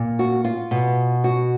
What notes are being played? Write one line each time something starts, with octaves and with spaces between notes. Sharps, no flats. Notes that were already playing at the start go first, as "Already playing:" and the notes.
Already playing: A#2
F#4
F4
B2
F#4